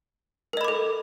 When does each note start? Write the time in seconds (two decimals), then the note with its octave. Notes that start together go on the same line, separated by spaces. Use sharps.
0.53 A#4
0.57 D#5
0.61 B5
0.64 D6
0.68 A4